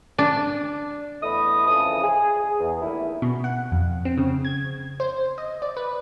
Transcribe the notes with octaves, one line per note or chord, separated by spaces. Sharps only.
D4
E2 A3 D#5 E5 B5 D#6
F2 C#3 E3 A5 D#6
G#4
E2
E2 G2 D#3 A3 A#3 E4
B2
F#5
F2
C4
C#3
G#6
C5
D#5
D5
B4